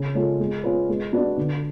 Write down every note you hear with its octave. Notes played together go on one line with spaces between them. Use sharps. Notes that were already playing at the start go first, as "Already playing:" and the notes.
Already playing: C#3
G#3 C#4 F4 A4
G#3
C#4 F4 B4
G#3
D4 F#4 B4 D5
D3